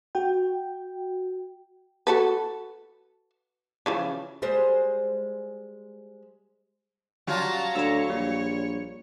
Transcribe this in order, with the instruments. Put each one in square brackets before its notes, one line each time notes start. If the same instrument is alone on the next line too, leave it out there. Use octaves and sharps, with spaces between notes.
[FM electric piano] F#4 G5
[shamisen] F#4 A4 B4
C#3 E3 F3
[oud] G3 G#3 C5
[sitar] F#3 F4 [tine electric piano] G3 [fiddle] A5 A#5
[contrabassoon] D2 [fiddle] C#5 [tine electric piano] A#5 E6
[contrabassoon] A#1 [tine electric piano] G3